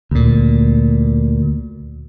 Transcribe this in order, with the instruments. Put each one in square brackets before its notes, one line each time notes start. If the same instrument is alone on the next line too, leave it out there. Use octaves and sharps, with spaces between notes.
[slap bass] D2 A#2